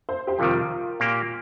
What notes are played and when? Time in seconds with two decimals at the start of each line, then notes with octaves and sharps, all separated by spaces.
0.09 C5
0.27 G4 C5
0.39 F2 C3 D#3 G3 F4 A#4
1.00 A#2 A#3 G4